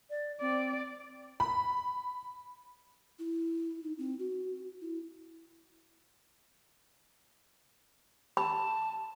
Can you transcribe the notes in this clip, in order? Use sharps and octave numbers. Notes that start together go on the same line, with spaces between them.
D5
C4 D5
B5
E4
D#4
C4
F#4
E4
A5 B5